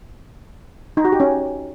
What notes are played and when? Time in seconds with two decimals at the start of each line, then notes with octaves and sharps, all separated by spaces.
0.97 D#4
1.05 F#4
1.12 G4
1.20 C#4